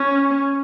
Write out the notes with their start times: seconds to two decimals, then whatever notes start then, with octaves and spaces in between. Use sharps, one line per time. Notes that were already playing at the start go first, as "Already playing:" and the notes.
Already playing: C#4